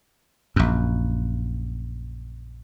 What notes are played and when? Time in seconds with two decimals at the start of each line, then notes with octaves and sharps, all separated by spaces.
0.56 A#1 F#2